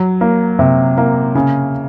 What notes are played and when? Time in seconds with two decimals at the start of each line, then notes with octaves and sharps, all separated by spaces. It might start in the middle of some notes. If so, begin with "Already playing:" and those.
Already playing: F#3
0.21 A#3
0.59 C3
0.98 A#3
1.35 C#3